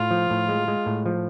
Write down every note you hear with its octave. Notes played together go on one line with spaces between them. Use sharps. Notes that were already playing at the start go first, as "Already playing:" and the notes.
Already playing: A2 F4
F3
A2
G#3
G#3
A2
F3